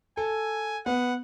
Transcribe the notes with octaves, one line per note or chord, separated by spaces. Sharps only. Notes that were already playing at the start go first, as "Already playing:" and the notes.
A4 G#5
B3 F#5